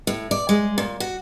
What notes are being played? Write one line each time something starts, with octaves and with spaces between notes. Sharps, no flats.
A2
D5
G#3
A#2
F#4